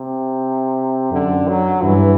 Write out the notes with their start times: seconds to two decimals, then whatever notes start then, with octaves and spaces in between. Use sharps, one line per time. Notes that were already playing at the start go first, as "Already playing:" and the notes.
Already playing: C3
1.11 F#2 D3
1.48 F#3
1.83 G2 E3